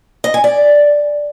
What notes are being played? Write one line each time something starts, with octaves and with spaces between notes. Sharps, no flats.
D#5
G#5
D5